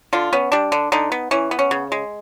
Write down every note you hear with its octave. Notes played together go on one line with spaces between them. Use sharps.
D3 F4
B3 C#4
G3 D4
D3
D3 D#4
B3
E3 C#4
B3
C#4
C#3
G#3